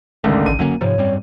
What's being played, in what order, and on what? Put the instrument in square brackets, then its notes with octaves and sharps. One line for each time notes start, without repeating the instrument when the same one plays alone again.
[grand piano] G#1 C#2 [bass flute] D3 [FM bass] G#3 [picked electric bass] A3
[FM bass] A1 [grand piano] D#7
[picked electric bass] F#1 F#3 C#4 [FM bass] D3 [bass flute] A#3
[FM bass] G#2 [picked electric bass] C3 F3 [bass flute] C#5
[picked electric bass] F#2 G3 C4